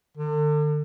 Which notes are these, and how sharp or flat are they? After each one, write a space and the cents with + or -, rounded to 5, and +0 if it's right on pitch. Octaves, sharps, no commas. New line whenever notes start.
D3 +35